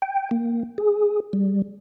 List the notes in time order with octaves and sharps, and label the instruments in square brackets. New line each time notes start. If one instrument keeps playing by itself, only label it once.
[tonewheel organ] G5
A#3
G#4
G3